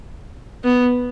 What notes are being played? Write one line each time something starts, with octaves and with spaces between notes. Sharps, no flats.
B3